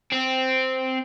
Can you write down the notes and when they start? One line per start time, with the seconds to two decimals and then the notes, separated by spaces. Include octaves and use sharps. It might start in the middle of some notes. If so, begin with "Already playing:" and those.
0.13 C4